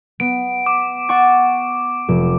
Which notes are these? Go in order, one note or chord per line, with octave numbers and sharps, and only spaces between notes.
B3 D7
D6
F#5 C#6 A6
F1